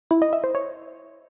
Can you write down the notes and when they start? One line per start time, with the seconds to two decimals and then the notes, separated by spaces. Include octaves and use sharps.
0.11 E4
0.22 D#5
0.33 E5
0.44 C5
0.55 C#5